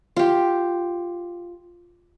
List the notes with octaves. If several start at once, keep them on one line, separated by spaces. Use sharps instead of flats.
F4 G4